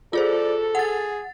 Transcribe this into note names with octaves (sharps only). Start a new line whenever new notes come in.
F4 G#4 A4 C5 D5
G#4 F#5 A6